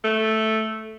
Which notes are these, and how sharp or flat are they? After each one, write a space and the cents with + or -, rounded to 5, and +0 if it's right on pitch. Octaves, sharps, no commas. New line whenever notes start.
A3 -5